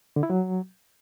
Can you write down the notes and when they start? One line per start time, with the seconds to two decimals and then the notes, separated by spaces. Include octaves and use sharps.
0.16 D3
0.23 E4
0.30 F#3